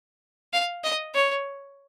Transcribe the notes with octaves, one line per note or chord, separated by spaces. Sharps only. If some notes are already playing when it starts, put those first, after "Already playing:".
F5
D#5
C#5